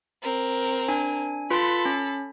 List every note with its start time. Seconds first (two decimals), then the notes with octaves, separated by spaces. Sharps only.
0.22 C4 A#4
0.88 D4 G#5
1.50 F4 A4 B4 B5 C6
1.85 C#4